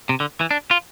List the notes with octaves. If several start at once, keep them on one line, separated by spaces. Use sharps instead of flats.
C3
D3
E3
D4
F4